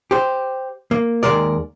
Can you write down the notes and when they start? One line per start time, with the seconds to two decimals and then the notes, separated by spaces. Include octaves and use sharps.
0.11 G4 C5
0.91 A#3
1.23 D#2 A#2 G#3 A#4 D5